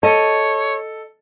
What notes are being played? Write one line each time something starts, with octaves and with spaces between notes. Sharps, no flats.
A4 C#5 D#5